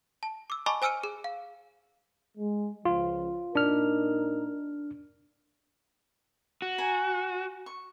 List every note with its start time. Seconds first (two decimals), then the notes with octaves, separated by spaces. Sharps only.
0.23 A5
0.50 D6 E6
0.66 D#5 G#5 A5 B5 C#6 D6
0.82 C5 G#5 E6 F6 C#7 D#7
1.03 G#4
1.24 F5
2.38 G#3
2.85 C#2 F3 F4
3.55 A#2 D4 D#4 A#4 F6
6.62 F#4
6.78 G#5 A#5
7.66 C#6